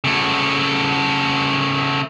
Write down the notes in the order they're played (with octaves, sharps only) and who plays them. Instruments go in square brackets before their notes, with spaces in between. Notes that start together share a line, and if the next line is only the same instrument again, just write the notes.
[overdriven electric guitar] C#3 A3